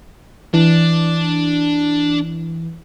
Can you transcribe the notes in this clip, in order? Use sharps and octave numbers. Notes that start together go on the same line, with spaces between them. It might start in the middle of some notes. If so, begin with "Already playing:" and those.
E3 D4